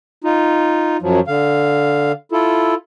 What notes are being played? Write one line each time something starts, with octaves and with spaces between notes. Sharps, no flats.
D#4 F4
F#2 F3 F#3
D3 F5
E4 F4 A4